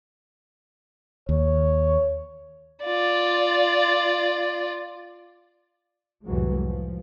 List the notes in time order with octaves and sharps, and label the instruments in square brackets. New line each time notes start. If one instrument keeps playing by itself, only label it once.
[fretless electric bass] D#2 [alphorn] C#5
[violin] F4 D5
[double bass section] C2 F2 A2 E3 F#3 G#3
F3